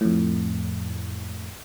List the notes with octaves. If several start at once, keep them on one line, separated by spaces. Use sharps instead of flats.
F2 A2